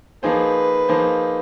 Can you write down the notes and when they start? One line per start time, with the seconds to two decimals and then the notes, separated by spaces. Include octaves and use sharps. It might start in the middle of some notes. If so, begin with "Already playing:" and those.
0.23 F3 A#3 D#4 G#4 B4 C5
0.88 F3 A#3 D#4 G#4 C5